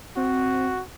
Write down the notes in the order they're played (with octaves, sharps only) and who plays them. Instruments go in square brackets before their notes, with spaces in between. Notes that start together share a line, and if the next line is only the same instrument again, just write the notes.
[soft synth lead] C4 [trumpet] F#4